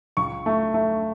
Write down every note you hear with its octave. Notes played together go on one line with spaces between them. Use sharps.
C#2 C#6
A3
A3